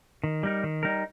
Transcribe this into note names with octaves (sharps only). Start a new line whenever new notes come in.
D#3
G3 D#4 A#4
D#3
G3 D#4 A#4